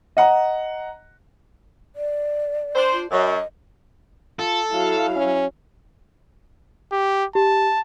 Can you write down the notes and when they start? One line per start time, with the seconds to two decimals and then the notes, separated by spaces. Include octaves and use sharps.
0.17 D#5 F#5 A#5
1.96 D5
2.75 D4 C5
2.93 F4
3.11 F#2 D#5
4.39 F4 A4
4.72 F#3 E4 F5
5.16 C#4
6.92 G4
7.35 G4 A5